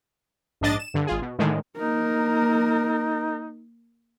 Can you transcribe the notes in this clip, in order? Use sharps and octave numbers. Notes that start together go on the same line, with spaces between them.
A#1 G#2 D4 D#5 A6
E7
G2 D3
G#1 F4 G#4
B2
A2 D3 D#3 G#3
A#3 D#4 A#4